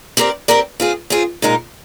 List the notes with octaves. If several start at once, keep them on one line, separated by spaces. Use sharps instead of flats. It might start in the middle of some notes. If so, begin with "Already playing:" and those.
C4 G4 A#4 D5
C4 G4 A#4 D5
C4 F4 G#4
C4 F4 G#4
A#2 G#3 D#4 A#4